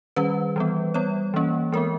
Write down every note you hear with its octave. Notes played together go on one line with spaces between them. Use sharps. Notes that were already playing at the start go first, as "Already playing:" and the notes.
D#3 G3 C#4 B4
E3 G3 B3
G3 B3 C#5
E3 A#3 C#4
E3 G#3 B3 A#4